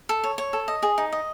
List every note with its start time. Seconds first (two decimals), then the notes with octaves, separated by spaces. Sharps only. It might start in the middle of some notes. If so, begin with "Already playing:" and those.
0.09 A4
0.24 C#5
0.38 C#5
0.53 A4
0.68 D#5
0.83 G#4
0.98 D#4
1.12 D#5